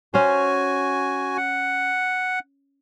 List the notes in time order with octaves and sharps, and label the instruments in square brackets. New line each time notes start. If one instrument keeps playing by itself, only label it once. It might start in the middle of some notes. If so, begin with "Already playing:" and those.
[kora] C#4 C5 [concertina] F#4 G#5
[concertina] F#5